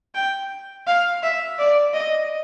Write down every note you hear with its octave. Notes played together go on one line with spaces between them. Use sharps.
G5
F5
E5
D5
D#5